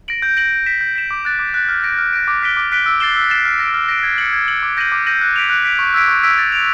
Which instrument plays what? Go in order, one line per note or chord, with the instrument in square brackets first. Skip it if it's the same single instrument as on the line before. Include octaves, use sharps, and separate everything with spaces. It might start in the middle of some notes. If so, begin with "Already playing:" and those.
[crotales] A#6 D7 F#7
G6
A#6 D7 F#7
G6
B6 E7
G6
B6 E7
D6
F#6 A6
D6
F#6 A6
F6
A#6 D7
F6
A#6 D7
D6
F#6 B6 D7 G7
D6
F#6 B6 D7 G7
E6
A6 C7 E7 G7
E6
A6 C7 E7 G7
F6
A#6 D7
F6
A#6 D7
G#6
C#7 F#7
G#6
C#7 F#7
D6
G6 A#6 D#7 F#7
D6
G6 A#6 D#7 F#7
F#6
B6 D7 F7
F#6
B6 D7 F7
C#6
E6 G#6 B6 D7
C#6
E6 G#6 B6 D7
A6
D7 F7